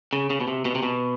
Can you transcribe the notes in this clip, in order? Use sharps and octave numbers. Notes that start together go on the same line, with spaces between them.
C#3
C#3
B2
C3
B2
C3
B2